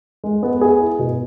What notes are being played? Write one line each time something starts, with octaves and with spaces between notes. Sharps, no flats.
G#3
B3
G#4
E4
B2